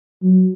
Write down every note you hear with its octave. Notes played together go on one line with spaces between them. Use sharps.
F#3